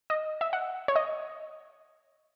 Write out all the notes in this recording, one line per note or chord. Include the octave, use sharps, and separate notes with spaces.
D#5
E5
F#5
C#5
D#5